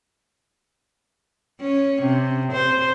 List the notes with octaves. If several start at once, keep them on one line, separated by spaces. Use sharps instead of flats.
C#4
C3
C5